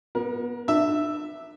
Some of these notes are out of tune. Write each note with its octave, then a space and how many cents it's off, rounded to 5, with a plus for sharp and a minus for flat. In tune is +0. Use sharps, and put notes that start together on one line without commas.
B3 -25 A#4 +25
D4 +35 E5 +0